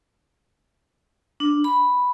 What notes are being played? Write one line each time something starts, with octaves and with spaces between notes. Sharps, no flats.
D4
B5